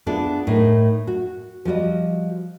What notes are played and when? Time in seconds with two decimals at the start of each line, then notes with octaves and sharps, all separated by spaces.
0.06 B3 D4 E4 F4 G#4 B4
0.47 A2 D#4 A#4
1.07 F#4
1.65 F3 G3 F#4 D#5